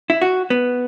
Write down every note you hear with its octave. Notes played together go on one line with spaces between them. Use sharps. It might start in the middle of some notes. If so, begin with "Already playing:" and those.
E4
F#4
B3